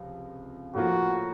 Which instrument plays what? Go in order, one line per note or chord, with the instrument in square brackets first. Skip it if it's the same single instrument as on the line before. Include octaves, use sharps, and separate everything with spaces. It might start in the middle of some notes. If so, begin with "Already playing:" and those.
Already playing: [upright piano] C#2 C3 F3
[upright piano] A2 F3 A#3 F4 [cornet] F#4